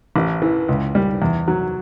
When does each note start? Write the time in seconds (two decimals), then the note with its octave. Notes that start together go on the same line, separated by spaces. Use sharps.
0.16 A1
0.42 E3
0.69 C#2
0.95 G3
1.22 E2
1.48 F#3